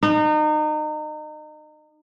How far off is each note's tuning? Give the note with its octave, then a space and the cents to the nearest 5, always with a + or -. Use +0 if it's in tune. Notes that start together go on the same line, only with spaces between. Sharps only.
D#4 -30